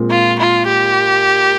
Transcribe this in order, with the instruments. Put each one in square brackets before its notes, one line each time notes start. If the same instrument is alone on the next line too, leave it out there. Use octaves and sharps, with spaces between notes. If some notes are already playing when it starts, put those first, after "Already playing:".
Already playing: [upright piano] A#2 G#3 C4
[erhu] F4
F4
G4